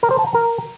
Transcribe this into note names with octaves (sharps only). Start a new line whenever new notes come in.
A#4
C5
A5
A#5
A#4